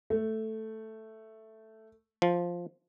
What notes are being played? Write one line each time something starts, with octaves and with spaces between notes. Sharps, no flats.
A3
F3